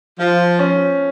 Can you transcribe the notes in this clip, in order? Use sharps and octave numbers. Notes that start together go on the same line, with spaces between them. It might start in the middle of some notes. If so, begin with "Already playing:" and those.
F3 F4
C#4